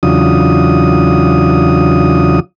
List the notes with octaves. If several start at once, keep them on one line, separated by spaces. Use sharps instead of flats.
E2 C#3 F#3 D4 F4 D#6